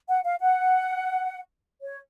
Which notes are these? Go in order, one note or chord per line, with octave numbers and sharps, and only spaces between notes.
F#5
F5
F#5
C#5